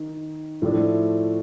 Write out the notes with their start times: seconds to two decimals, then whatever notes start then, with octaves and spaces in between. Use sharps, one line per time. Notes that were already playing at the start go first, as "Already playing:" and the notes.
Already playing: D#3 D#4
0.62 A2 F3 A3 D4